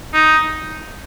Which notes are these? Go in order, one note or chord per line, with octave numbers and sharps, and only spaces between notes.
D#4